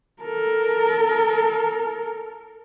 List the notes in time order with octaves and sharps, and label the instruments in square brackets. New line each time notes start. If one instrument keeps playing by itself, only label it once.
[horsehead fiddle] A4 A#4